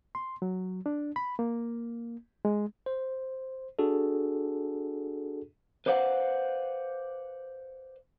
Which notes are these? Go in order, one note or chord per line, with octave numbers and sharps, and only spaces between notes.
C6
F#3
D4
B5
A#3
G#3
C5
D4 F#4 G#4 A4
B4 C5 D5 F5 F#5